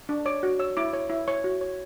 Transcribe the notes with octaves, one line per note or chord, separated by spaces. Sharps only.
D4
C#5 D6
F#4
C#5 E6
E4 D6
C#5
E4
C#5 C#6
F#4
C#5